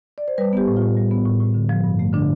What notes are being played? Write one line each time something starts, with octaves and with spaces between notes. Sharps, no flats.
D5
C5
G3 B4
B3 G4
A2
F4
A2
G3
B3
A2
A2
D3
F3
G2
A3
D3 D4